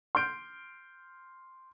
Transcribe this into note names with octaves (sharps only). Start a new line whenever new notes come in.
C6 F6 G6 D7